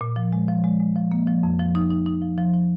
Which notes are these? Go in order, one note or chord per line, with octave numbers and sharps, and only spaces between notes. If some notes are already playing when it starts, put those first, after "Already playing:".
A#2
F3
G#3
F3
G#3
G#3
F3
A#3
F3
F2
F3
D#4
D#4
D#4
F3
F3
F3